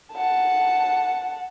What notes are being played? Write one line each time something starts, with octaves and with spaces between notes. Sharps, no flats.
F#5 A5